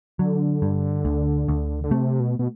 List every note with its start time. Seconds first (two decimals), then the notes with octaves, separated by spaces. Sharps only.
0.19 D3 F#3
0.62 G2
1.05 D2
1.48 D2
1.84 D3
1.91 C3 A3
2.20 B2
2.39 B2